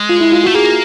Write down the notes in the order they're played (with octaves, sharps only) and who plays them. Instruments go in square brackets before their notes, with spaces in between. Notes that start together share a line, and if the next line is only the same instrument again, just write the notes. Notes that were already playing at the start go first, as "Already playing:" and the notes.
Already playing: [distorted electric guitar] G#3
[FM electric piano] F4
E4
F4
[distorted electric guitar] A3 [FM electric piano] F#4
[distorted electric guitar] A#3 [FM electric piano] G#4